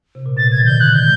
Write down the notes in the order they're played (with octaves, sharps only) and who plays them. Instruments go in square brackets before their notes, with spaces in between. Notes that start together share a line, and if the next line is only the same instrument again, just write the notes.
[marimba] C3
A#2
[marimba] B2 [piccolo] A6
[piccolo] G#6
[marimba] D#3
[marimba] D3 [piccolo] G6
[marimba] D3 [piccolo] F#6
[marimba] G#3 [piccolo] G6